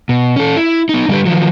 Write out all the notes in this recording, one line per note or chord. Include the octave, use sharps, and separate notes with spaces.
B2
C#4 A4
E4
B3 D#4
D3 G3 A3 G4 B4
D#3 F3 F#3